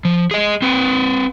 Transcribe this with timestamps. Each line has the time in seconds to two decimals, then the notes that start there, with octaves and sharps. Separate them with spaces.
0.05 F3
0.31 G#4 D#5
0.62 C4 B4